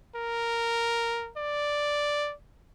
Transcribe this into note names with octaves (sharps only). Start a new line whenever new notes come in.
A#4
D5